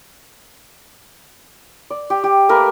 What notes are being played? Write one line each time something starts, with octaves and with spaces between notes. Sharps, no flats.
D5
G4
G4
A3 A#3 A#4 B4